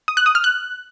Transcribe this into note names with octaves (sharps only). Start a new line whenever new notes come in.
D#6
F#6
D#6
F6
F#6